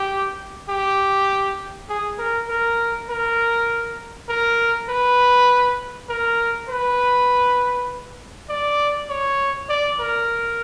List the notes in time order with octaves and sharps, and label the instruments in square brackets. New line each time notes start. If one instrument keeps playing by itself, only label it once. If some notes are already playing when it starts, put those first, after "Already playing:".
Already playing: [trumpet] G4
G4
G#4
A#4
A#4
A#4
A#4
B4
A#4
B4
D5
C#5
D5
A#4